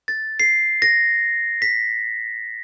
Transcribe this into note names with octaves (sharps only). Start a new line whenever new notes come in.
A6
C7
A#6
B6